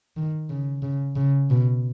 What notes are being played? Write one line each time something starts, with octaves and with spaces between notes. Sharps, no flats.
D#3
C#3
C#3
C#3
B2